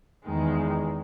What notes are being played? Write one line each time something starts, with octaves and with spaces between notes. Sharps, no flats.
E2 D#3 G#3